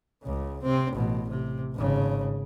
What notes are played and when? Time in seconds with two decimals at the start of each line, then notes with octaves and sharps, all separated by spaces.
0.22 C#2 C#3
0.63 C3 C4
0.93 A1 B2
1.30 C3
1.74 G#1 C#3